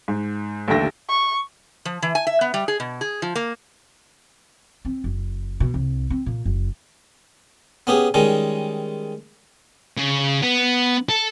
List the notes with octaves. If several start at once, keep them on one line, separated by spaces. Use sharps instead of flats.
G#2
A1 D#2 D3 E5 G5 A#6
C#6
F3
E3
G#5
E5
B3
G3
G#4
B2
G#4
F3
A#3
C4
F#1
B2
C2
C4
A#2
F#1
B3 C#4 G4 G#4
D#3 G3 G#3 C#4
C#3
B3
A4